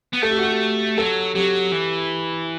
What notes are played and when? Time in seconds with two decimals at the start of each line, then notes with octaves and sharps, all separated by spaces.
0.13 B3
0.22 A3 A4
0.31 G4
0.38 F#4
0.46 G4
0.98 F#3 A4
1.35 F#3 G4
1.72 E3